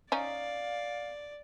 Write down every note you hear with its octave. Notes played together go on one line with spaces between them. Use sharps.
C#4 D#4 D5 F5